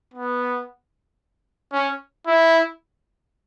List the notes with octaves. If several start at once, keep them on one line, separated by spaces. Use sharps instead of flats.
B3
C#4
E4